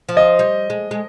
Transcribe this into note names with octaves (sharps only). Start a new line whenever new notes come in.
F3
D#5
G3
G#3
G#3